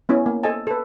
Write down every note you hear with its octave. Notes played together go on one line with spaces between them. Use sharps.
B3 C#4 E4
A#3
A4 C5 D#5 G#5 A5
A4 B4